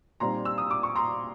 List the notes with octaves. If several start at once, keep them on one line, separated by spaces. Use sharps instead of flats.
A#2 G3 C4 D#4 A#5 C6
E6
D#6
D6
C#6
A#5 C6